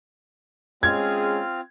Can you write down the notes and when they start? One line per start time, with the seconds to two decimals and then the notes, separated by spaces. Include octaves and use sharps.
0.83 G#3 C4 C#4 F4 G#4 F6 G#6